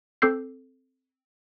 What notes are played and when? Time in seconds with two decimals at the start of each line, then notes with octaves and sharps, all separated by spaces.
0.22 C4 A4 D6 E6 G6 C7